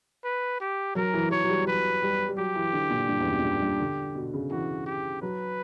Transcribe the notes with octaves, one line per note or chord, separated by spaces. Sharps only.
B4
G4
F#3 A#4
E3
F#3 C#5
F#3
G3
F#3 B4
G3
G3
F#3 G4
E3
D3
A#2
G2
E2
F#2
A#2
G2
G2
D3
B2
C#3
E3 F#4
G4
F#3 B4